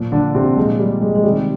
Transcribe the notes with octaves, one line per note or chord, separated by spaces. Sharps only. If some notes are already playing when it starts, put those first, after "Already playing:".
Already playing: A#2 F3
D3 D4
C3 C4
A#2 F3 G#3
G3
G#3
G#3
C3 D#3 G3